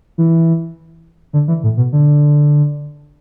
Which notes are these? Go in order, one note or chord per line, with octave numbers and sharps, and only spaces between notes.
E3
D3
E3
A2
B2
D3